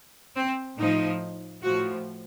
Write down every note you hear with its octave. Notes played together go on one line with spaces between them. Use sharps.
C4
A2 F3 D#4
A2 F3 F#4